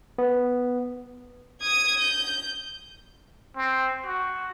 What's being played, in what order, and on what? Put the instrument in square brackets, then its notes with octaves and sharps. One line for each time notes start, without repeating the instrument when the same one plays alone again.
[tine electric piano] B3
[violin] D#6 G#6
G6
[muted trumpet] C4
F#4